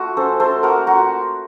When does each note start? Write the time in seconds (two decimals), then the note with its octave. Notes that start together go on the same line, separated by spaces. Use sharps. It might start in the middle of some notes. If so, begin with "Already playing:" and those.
Already playing: A3 F4 F#4
0.17 C#4 A4 C5
0.40 A3 A4 C5
0.63 A#3 F#4 A#4
0.87 F4 F#4